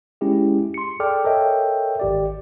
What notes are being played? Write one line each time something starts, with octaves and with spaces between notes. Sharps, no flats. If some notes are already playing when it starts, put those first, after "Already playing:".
G#3 C#4 E4 G4 G#4
C6 C#7
G#4 A4 D5 G5 D6 F6
A4 A#4 C#5 D#5 E5 G5
G#1 G4 D5